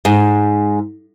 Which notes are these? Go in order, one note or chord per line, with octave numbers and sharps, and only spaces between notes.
G#2